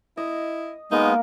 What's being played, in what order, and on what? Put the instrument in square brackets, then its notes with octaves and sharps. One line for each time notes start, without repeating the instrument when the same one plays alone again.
[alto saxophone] E4 [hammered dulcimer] D#5
[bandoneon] G#3 B3 [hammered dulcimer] A#3 A#4 [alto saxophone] D#4